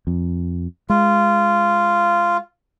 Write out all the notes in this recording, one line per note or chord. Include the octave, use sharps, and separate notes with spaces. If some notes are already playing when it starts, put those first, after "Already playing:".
F2
G#3 F4